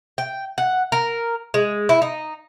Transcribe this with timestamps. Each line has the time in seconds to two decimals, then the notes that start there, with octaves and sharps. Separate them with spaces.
0.18 G5
0.58 F#5
0.92 A#4
1.54 G#3
1.89 E4
2.02 D#4